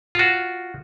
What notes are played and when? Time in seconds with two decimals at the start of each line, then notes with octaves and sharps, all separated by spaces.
0.15 F4 F#4